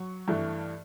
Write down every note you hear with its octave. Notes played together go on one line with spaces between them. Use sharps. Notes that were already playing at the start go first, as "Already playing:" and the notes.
Already playing: F#3 C#6
G2 E3 A3